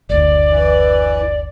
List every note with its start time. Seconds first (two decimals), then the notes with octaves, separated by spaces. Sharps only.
0.09 F#1 D2 D5
0.50 E3